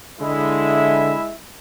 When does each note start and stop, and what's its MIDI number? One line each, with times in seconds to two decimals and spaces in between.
0.21 1.14 50
0.21 1.29 56
0.21 1.33 64
0.21 1.33 76